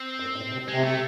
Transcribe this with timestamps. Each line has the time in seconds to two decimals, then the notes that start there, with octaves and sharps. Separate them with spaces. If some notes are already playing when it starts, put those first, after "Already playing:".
Already playing: C4
0.20 F#2
0.36 A2
0.53 C3
0.68 C3 G#3
0.84 A3